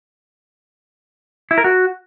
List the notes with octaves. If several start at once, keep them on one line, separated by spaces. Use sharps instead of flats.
E4
A#4
F#4